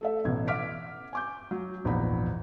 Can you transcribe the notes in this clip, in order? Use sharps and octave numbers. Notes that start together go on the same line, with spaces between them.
A3 A4 E5
A1 B2 G#6
E5 F#5 D6 F6 B6 D7
G#5 D6 G6
F#3
D#1 A#1 E2 G#2 A#5 B5